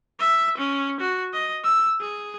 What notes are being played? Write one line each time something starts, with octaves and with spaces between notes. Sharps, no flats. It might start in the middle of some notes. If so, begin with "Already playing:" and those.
E5
C#4
F#4
D#5
E6
G#4